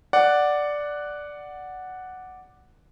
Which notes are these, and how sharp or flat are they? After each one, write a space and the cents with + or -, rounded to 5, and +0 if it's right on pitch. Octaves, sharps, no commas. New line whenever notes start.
D5 +0 F#5 +0